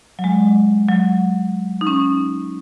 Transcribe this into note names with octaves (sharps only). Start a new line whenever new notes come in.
F#3
G#3
F#3
D#4
C#4